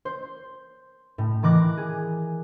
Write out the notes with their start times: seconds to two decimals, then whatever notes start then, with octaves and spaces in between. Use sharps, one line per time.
0.05 C5
1.18 A2
1.43 D#3 E3 D6 F#6 A#6
1.77 G#4